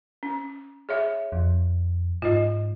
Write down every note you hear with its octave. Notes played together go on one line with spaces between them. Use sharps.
C#4
G#4 C#5 E5
F2
G#2 F4 D#5